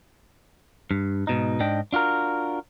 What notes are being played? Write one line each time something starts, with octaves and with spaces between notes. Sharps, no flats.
G2
G#2 B2 D#4
G#2 D4 D#5 G5
D4 F4 F#4 A#4